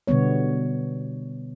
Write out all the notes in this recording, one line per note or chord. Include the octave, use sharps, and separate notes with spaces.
B2 D3 G3 B3 C#5